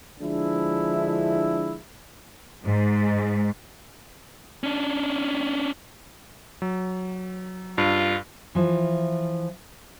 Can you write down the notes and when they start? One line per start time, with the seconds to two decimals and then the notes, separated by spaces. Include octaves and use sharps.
0.20 D3 F3 G#3 D4 E4
2.64 G#2
4.64 C#4 D4
6.62 F#3
7.78 G2 F4
8.55 E3 F3